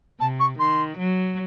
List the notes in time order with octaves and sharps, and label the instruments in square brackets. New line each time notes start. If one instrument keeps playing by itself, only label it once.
[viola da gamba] C3 [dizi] A5
[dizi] C#6
[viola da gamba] D#3 [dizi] C6
[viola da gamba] F#3